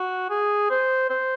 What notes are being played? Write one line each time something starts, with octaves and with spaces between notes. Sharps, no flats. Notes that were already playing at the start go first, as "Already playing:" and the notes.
Already playing: F#4
G#4
C5
C5